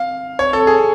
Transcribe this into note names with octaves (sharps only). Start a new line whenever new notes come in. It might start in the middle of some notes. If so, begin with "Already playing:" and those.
Already playing: F5
C#5
A4
G#4